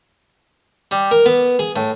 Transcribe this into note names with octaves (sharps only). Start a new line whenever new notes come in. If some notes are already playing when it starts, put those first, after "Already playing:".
G3
A#4
B3
G#4
A2